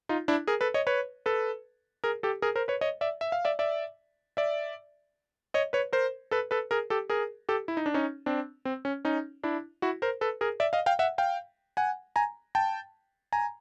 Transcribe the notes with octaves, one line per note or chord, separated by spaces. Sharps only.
D#4 F4
D4 E4
G#4 A#4
A4 B4
C#5 D#5
B4 C#5
A4 B4
G#4 A#4
G4 A4
G#4 A#4
A#4 C5
B4 C#5
C#5 D#5
D5 E5
E5
F5
D5 E5
D5 E5
D5 E5
C#5 D#5
B4 C#5
A#4 C5
A4 B4
A4 B4
G#4 A#4
G4 A4
G#4 A#4
G4 A4
E4
D#4
D4
C#4 D#4
C4 D4
C4
C#4
C#4 D#4
D4 E4
E4 F#4
A#4 C5
A4 B4
G#4 A#4
D5 E5
D#5 F5
F5 G5
E5 F#5
F5 G5
F#5 G#5
G#5 A#5
G5 A5
G#5 A#5